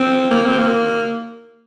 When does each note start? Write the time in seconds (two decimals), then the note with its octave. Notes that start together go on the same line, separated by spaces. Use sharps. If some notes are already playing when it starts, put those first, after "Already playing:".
Already playing: C4
0.31 A#3
0.46 C4
0.59 A#3